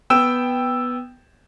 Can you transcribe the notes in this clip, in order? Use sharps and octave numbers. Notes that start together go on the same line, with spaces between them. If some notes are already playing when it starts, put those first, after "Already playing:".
B3 G5 E6 E7